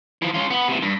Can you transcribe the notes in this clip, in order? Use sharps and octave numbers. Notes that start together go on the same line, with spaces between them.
E3 F3
C#4 F4
B3
C3 E3
G2